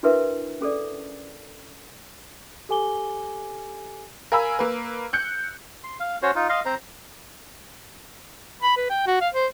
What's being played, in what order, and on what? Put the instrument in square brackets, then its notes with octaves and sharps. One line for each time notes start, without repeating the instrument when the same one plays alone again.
[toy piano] D4 E4 F#4 A#4 B4 E5
C#4 G#4 A4 D5
[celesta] G4 A4 G#5 D6 G7
[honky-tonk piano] A#4 F5 G#5 B5 E6
A#3 B4
F#6 G6 C#7
[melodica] C6
F5
C#4 F#4 C5 C#5
D#4 F4
D#5 F5 C6
C4 C5 A#5
[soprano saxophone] B5
B4
G5
F#4
F5
C5